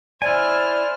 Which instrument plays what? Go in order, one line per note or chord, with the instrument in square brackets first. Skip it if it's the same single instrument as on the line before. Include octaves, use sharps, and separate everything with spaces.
[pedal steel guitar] E4 G#5 [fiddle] C5 F6 [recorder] D5